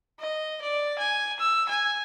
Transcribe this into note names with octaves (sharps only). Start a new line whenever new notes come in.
D#5
D5
G#5
E6
G#5